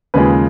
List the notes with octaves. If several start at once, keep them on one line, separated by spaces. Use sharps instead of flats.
D#2 C#3 F3 G#3 B4